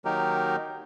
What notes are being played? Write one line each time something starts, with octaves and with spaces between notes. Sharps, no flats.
D#3 F#3 A#3 D#4 G4 A#4